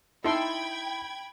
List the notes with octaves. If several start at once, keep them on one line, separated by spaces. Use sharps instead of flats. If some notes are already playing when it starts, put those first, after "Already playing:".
D#4 E4 A4 G5 A5 B5 C6 G#6